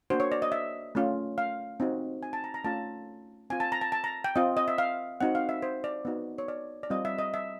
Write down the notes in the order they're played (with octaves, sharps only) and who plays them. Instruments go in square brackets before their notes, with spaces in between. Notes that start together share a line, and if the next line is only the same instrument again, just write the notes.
[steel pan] A#3 D4 F#4 C5
C#5
D5
D#5
E5
A3 C#4 F4
F5
C4 D#4 F#4
G#5
A5
A#5
A#5
A3 C#4 F4 A5
C4 F4 G#5
A5
A#5
A5
A5
A#5
G5
C4 F4 D#5
D#5
E5
F5
C4 D#4 F#4 F#5
F5
E5
C5
D5
B3 D#4 F#4
C#5
D5
D5
G3 C4 F4 D#5
E5
D#5
E5